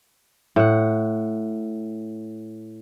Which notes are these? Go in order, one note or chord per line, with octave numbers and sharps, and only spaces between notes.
A2 F#5